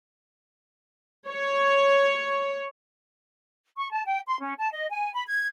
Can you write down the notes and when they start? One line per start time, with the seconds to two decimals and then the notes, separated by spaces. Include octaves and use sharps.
1.28 C#5
3.77 C#6
3.91 A5
4.06 G5
4.27 C6
4.40 C#4
4.59 A5
4.73 D#5
4.90 G#5
5.15 B5
5.28 G#6